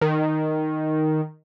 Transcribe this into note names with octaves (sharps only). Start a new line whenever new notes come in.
D#3